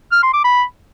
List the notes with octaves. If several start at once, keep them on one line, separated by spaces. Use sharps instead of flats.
F6
C6
D6
B5